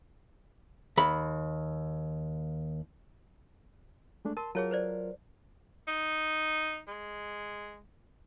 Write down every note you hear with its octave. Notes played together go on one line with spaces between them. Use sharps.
D#2 B5
G#3 A3 D4
A#4 A5 C6
F#3 F4 G#4 A#4 C#5 A5
B4 C5 D5
D#4
G#3